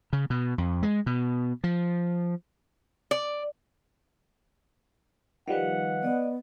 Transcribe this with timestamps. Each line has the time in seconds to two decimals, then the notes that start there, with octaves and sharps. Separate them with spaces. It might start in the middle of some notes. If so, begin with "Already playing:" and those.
0.13 C#3
0.30 B2
0.58 F2
0.83 G#3
1.06 B2
1.64 F3
3.11 D5
5.48 D#3 F3 G3 B4 D#5 F5 F#5
6.03 B3 D5 D#5